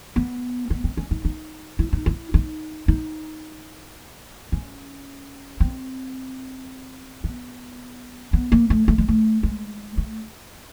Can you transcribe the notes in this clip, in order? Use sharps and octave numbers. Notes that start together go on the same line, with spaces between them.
B3
B3
C4
C#4
D#4
D#4
E4
D#4
E4
D#4
D#4
C#4
C4
B3
B3
A#3
A3
A3
G#3
A3
G#3
A3